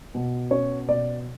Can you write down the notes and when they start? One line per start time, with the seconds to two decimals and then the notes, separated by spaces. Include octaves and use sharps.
0.15 B2
0.51 C#4 C#5
0.88 B2 D5